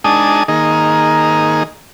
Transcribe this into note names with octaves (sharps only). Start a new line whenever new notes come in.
G#3 D4 D#4 G#5 A5 D#6
D#3 A#3 D#4 G#4